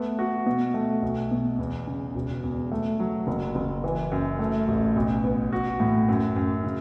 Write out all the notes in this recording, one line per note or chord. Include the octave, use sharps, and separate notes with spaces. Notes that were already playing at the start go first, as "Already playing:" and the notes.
Already playing: A3 B3
F#4
B2
A3
B1
B2
E2
C#3
E1
E2
A3
F#3
F#1
F#1
E3
F#2
A3
A1
B1
B3
F#4
A2
F#2
F#2
C#3